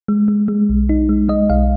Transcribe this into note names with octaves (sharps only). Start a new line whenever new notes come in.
G#3
G#3
G#3
B1
D#4
G#3
G#3 D#5
B1 F5